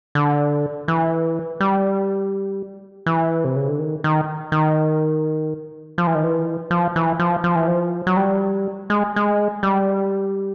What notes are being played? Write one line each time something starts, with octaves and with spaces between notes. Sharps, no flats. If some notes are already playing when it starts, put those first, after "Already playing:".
D3
E3
G3
E3
C3
C#3
D3
D#3
D#3
D#3
F3
E3
D#3
E3
F3
E3
F3
F3
E3
F3
F#3
G3
G#3
G#3
G3